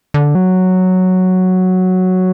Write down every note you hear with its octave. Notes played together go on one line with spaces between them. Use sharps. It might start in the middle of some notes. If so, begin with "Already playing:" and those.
D3
F#3